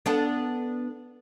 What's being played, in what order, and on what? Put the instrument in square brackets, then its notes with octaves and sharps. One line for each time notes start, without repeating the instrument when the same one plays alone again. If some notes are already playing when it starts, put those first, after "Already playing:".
[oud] B3 D4 A4